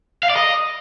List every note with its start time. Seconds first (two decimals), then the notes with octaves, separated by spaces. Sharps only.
0.23 F5
0.30 D5
0.36 D#5